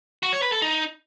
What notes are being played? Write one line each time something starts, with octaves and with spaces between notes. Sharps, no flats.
F#4
C#5
B4
A4
D#4